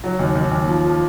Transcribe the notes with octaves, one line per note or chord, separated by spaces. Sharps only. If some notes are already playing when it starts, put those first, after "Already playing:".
F#3
D#2
D#2
D#2
F3
F3